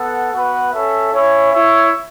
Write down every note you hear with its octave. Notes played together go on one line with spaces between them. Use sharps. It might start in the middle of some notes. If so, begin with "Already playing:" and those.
Already playing: B3 A4 F#5
B3 F#4 B4 F#5
C#4 A4 E5
C#4 E4 C#5
E4 C#5 E5